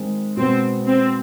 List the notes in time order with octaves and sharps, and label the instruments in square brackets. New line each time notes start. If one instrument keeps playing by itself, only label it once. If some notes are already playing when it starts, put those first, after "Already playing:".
Already playing: [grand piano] D#3 G#3 C4
[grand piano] B2 G#3 B3 [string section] C4
[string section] C4